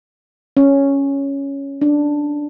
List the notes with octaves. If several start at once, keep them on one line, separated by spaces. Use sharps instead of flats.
C#4
D4